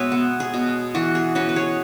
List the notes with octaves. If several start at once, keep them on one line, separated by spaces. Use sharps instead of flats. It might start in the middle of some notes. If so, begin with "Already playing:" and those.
Already playing: B2 G#3 F#4 G#4 B4 C#5 E5
B3
G#4
B2
E3 F#4
G#4
C#4 F#4 B4
B4
G#4 C#5